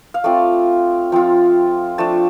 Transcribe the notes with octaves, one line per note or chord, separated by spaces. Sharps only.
F5
A3 C4 F4 D5
F3 C4 F4
F3 A3 D4 A5